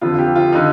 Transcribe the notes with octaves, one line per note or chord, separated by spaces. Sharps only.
F2 D3 F4
G4
F4
D3 D#4